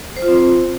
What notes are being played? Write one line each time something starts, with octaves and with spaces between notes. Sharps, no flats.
C5
F4
C4